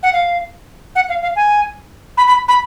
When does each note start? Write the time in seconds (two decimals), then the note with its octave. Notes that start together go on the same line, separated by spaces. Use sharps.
0.03 F#5
0.13 F5
0.96 F#5
1.09 F5
1.22 F5
1.36 G#5
2.17 B5
2.28 B5
2.48 B5